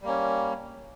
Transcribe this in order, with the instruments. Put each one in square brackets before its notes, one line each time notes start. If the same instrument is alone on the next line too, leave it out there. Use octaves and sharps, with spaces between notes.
[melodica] G3
A#3
C#4